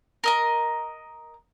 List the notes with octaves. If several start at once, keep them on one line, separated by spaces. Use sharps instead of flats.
A#4 D#5 A#5